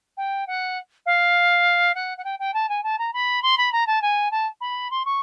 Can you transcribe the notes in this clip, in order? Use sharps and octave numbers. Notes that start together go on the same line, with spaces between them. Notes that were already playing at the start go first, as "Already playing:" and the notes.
G5
F#5
F5
F#5
F#5
G5
G5
A5
G#5
A5
A#5
B5
C6
B5
A#5
A5
G#5
A5
B5
C6
C#6